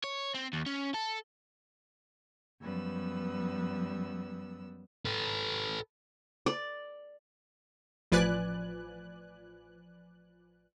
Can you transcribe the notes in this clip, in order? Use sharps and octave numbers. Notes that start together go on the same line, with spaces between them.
C#5
C4
D#2
C#4
A4
F#2 F3 G3 B3 B4 E6
A4 B4
D5
A1 F3 B4 D5 G#5 F#6